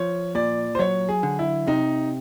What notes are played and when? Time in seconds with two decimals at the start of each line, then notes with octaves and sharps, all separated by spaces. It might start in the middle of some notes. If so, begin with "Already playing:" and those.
Already playing: F3 C#5
0.35 A#2 D5
0.75 C5
0.79 F#3 C#5
1.09 G#4
1.23 D3
1.39 E4
1.67 C3 D#4